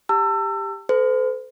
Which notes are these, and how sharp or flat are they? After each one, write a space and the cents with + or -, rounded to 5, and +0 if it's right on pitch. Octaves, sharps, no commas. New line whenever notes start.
G4 +10 A5 +40 E6 +25
A4 +0 C5 -40